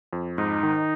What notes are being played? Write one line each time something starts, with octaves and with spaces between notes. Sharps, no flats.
F2
G#2 D#4
D#3